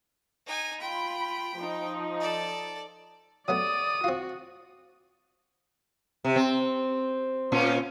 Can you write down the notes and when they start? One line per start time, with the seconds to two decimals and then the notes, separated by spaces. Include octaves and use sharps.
0.47 D#4 G#5
0.81 F4 G5 B5
1.59 F3 D#4
2.20 A4 D5
3.48 F#3 A3 B3 D5 D#6
4.04 C4 F4 F#4
6.24 C3
6.36 C4
7.52 A#2 C#4 F4